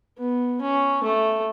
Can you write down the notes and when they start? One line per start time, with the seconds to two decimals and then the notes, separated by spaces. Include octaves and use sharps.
0.19 B3
0.61 C#4
1.04 A3